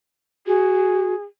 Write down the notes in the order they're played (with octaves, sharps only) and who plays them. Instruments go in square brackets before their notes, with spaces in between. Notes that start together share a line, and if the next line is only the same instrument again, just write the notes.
[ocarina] F#4 [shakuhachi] G#4